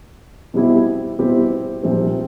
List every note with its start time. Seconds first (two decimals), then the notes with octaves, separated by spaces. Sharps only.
0.54 B2 G3 C4 E4 G4
1.19 B2 G3 C4 E4 G4
1.83 A#1 A#2 G3 C4